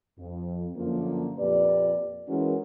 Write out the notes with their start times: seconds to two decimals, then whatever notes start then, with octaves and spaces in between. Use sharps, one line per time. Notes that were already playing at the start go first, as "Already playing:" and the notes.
0.18 F2
0.76 F#2 D3 F3 A#3
1.38 F2 A#2 G4 B4 D5
2.28 E3 G#3 C#4 F#4 A#4